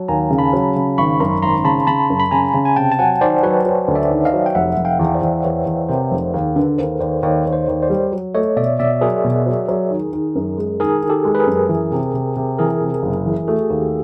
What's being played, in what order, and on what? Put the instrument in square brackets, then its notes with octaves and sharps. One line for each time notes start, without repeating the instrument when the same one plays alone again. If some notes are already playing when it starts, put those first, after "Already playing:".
Already playing: [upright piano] F#3 [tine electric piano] A5
[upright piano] D#2 [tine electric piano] G#5 A#5
[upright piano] C#3
[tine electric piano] A5 B5
[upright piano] F#3
C#3
[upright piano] G#1 [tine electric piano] B5 C#6
[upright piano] F#2 [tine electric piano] A#5 C6
[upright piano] G#1 [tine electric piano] A#5 C6
[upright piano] C#3 [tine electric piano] A5 B5
[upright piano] C#3 [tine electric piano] A5 B5
[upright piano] F#2
[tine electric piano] B5
[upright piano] C#3 [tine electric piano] G#5 A#5
[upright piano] C#3
[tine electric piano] G#5
[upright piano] C3 [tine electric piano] G5 A5
[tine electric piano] A5
[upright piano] F#3 [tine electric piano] F#5 G#5
[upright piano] D#3 [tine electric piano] C5 D5
[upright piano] F#3 [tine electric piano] B4 C#5
[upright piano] F#3
D2
[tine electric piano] D5 E5
[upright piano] D#3
[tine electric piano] D#5 F5
[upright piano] F#3
[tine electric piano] G5
[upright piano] F1 [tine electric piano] E5 F#5
[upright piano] F1
[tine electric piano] F5 G5
[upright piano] E2
[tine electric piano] C5 D5
[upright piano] E2
[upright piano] E2 [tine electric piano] B4 C#5
[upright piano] E2
[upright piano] C3 [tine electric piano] A#4 C5
[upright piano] F1
[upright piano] D#2 [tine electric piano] G#4 A#4
[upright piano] D3 [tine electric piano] A4 B4
[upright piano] D#2 [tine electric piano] A#4 C5
[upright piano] D#2 [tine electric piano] C5 D5
[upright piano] D#2 [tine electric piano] C#5 D#5
[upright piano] D#2
[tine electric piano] C5 D5
[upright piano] D#2
[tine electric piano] C5 D5
[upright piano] G3
F#3
[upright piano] A3 [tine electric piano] C#5 D#5
[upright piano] B2 [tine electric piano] D5 E5
[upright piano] B2 [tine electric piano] D5 E5
[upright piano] F#3 [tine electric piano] G#4 A#4
[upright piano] B2
F#3
F#3
D#3
D#3
F#2
G#3
[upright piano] D#3 [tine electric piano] G#4 A#4
[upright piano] D#3
[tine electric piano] G4 A4
[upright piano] G#3
[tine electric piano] B4
G#4 A#4
[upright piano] F#2
E3
C3
C3
C3
[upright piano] E3 [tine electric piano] G#4 A#4
[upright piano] C3
F#1
E3
[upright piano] A3 [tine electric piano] F#4 G#4
[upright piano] D#2 [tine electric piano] G4